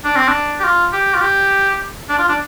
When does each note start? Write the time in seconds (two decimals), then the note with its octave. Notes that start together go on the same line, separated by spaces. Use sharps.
0.05 D4
0.16 C4
0.28 D4
0.60 G4
0.64 F4
0.93 G4
1.14 F4
1.21 G4
2.09 D4
2.18 F4
2.28 D4